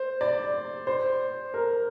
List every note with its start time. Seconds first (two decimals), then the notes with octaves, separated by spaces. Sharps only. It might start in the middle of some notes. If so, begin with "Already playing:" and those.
Already playing: C5
0.21 D5
0.87 C5
1.54 A#4